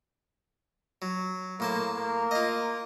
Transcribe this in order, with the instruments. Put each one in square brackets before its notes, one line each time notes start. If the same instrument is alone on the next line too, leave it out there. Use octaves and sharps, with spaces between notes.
[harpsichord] F#3
[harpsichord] A2 C5 A5 [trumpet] A#3
[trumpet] A#3
[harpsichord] F4 D#5